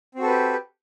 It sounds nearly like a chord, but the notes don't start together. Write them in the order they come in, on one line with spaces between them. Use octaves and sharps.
C4 F#4 A4 B4 G4